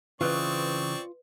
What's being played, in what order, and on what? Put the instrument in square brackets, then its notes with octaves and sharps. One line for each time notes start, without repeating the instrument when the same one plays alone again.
[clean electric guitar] C#3 E3 [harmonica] C4 D5 C#6 [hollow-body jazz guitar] F4 [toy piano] B4 D#5